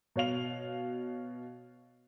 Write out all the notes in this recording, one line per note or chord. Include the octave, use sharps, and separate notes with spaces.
B2 C#5 F5 F7